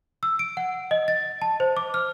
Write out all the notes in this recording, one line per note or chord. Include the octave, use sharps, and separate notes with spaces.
E6
D7
F#5
D#5
A6
A5
C5
D6
F6